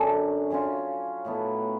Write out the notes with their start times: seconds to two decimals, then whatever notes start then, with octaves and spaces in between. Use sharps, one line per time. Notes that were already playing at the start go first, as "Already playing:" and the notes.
Already playing: F#2 D3 F#3 C#4
0.50 C#3 F#3 C#4 F4
1.25 A2 F#3 B3